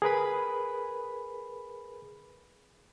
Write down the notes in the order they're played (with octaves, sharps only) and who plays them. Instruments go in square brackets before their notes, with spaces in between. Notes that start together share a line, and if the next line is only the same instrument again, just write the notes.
[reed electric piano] G#4 A#4 B4 B5